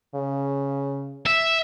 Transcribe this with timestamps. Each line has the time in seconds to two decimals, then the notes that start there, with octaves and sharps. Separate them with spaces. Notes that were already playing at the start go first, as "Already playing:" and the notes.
0.15 C#3
1.26 E5